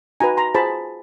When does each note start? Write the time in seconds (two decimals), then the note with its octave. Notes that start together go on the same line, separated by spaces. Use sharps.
0.20 D#4 F#4 B4 G#5 A#5
0.37 A#5 C6
0.55 F4 G#4 C5 A5 B5